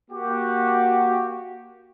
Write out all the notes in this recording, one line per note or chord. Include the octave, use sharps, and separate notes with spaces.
A#3 F#4 G4